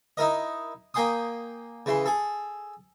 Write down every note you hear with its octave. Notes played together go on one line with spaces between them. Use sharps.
D#4 E4 A#4 D#5
A#3 G5 G#5 C6 D#6
C#3 E3 C6
G#4 A4